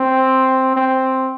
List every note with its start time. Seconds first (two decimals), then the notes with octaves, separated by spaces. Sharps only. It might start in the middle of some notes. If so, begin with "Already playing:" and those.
Already playing: C4
0.76 C4